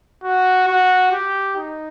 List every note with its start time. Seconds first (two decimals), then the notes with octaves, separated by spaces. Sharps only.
0.23 F#4
0.68 F#4
1.12 G4
1.57 D#4